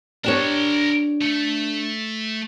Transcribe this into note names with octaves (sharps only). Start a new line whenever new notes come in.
D4 G4 A#4 C#5 A5
A3